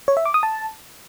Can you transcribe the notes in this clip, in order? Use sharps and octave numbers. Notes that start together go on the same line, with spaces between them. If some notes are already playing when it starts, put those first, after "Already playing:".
C#5
E5
D6
D#6
A5